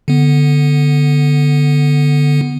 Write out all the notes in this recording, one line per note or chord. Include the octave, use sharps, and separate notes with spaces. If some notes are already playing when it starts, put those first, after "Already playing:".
D3 B3